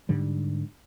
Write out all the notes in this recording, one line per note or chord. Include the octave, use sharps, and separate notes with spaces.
G#2 D3 G3